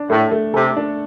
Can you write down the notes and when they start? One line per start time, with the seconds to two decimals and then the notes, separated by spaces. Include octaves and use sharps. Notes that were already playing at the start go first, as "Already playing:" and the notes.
Already playing: D4
0.10 A2 A3
0.32 A3
0.54 C3 A4
0.76 D4